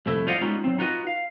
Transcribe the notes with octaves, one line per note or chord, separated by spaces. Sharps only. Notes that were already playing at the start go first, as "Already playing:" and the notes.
C2 F2 A3 E4 A4
F4 C5 D5 D#5 F5 F#5
G3 G#3 B3 C#4 D#4 F4
F#3 C4
D#4 F4 F#4 B4 D#5
F5